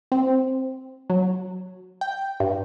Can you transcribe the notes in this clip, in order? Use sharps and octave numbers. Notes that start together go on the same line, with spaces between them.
C4
F#3
G5
G2